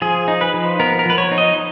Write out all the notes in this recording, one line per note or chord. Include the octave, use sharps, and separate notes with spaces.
F3 G#4
D#4
B4
F3
B3 A#4
A#4
F3 B4
C#5
D#4
D#5